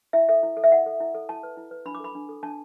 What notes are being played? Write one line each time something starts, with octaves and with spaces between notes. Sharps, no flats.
E4 E5
A4 E5
E4
A4
E5
E4 F#5
A4
E4
A4
E4 A5
B4
E4
B4
D4 B5
D6
A4 B5
D4
A4
D4 A5